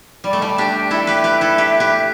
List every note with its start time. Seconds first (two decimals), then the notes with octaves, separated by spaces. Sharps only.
0.24 G3 D5
0.33 A3
0.42 G3 A5
0.57 D4 G4 A5
0.75 G5
0.91 E4 A4 E5
1.07 G4 B4
1.24 G4 B4
1.41 E4 A4
1.58 G4 B4
1.80 G4 B4